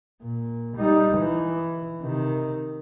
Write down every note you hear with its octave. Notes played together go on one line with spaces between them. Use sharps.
A#2
G3 D#4
E3
C3 D#3